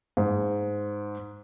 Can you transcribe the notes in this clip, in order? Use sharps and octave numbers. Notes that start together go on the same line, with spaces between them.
G#2